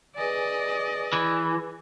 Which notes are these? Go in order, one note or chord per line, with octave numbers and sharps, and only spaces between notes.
G#4 B4 D5 D#5 G#5
E3